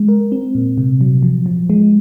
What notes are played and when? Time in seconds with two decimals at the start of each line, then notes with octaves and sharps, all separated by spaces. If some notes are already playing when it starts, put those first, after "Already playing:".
Already playing: G#3
0.08 A#4
0.32 C4
0.55 A#2
0.78 C3
1.01 F#3
1.23 F3
1.46 F3
1.70 G#3